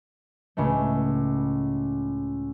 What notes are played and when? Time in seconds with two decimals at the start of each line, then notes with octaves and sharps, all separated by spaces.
0.57 C#2 A2 A3